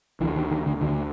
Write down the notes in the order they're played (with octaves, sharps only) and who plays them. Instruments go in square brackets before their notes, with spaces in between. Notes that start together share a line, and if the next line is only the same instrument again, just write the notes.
[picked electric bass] D2 D3 E3
D#3
D#3
D3
D2 D3 D#3